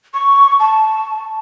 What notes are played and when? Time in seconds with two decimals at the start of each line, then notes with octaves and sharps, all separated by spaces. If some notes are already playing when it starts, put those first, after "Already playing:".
0.14 C#6
0.59 A5